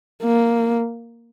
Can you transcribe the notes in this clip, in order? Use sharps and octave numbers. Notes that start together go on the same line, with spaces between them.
A#3